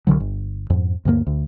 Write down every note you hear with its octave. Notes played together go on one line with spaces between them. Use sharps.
C2 A#2 D3 F#3
G1
F2 G#2
D2 G2 G3 A#3
D2